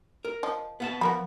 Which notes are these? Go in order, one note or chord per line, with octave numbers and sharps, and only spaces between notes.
A#4
F3 D#5
B3 F5 A5
F3 B3 A#4 B5